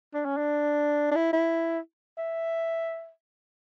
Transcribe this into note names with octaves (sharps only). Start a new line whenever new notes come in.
D4
C#4
D4
D4
E4
E4
E5